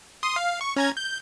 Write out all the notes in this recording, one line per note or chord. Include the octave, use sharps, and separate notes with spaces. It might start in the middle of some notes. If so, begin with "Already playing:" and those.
C6 D#6
F5
C#6
C#4 A#5 G#6
G6